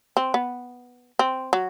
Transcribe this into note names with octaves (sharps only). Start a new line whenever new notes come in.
C4
B3
C4
F#3